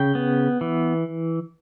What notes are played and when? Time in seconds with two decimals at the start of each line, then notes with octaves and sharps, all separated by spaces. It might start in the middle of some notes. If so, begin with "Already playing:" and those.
Already playing: C#3 G5
0.15 B3
0.61 E3